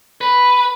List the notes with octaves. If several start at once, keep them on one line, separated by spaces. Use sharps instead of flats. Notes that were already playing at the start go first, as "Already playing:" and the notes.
B4